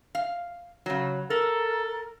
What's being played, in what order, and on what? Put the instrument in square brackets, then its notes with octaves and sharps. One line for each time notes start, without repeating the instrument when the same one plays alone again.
[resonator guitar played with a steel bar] F5
C#3 F#3
[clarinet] A4 [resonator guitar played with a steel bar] A#4